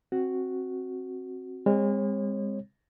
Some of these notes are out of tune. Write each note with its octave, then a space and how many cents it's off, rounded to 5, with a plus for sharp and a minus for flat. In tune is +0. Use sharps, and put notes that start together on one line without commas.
C4 +15 F#4 +0
G#3 -40 C4 +0 C#5 -35